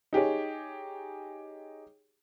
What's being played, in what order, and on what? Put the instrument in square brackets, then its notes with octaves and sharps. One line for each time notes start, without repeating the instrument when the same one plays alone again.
[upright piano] D#4 G4 G#4 C#5